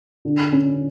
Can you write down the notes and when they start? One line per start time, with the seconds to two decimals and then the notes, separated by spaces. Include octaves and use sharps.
0.25 D3
0.52 C#4